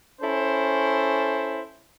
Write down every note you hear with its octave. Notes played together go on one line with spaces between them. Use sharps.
C#4 E4 A4 C5